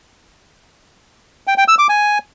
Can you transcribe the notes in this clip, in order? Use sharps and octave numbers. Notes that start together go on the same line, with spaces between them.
G5
G5
E6
D6
G#5